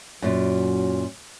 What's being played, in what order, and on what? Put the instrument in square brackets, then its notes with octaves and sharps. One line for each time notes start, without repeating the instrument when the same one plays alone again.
[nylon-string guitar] F#2 A#2 [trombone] F#3